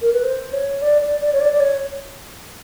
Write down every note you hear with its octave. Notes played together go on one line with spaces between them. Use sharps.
A#4
B4
C5
C#5
D5
D5
D5
C#5
D5
D5
C#5